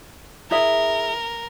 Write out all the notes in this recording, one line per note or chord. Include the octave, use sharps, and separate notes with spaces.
E4 G#4 A#4 E5